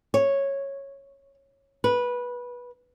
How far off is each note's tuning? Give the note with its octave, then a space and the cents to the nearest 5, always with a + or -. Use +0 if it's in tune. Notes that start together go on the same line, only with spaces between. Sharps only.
C#5 -10
B4 -15